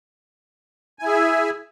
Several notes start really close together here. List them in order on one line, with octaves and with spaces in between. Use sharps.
G#5 E4 G#4 E5